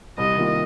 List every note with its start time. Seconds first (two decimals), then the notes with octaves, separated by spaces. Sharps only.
0.18 C2 D#5
0.37 C3 D#3 A#3 F4